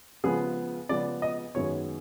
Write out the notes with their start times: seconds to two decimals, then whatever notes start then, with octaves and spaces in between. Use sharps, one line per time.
0.24 C#3 F3 G#3 B3 G#4
0.89 C#3 F3 G#3 B3 D5
1.22 D#5
1.55 F#2 D#3 G#3 B3 C#5